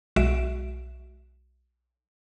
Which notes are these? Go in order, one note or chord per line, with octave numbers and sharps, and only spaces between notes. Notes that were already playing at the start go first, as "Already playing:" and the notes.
B1 G#3 F#4 E5 D7 E7